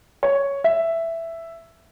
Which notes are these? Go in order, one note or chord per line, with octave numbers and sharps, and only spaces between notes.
C#5
E5